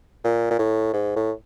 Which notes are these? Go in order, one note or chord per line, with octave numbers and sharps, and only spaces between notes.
A#2
A#2
A2
G#2
A2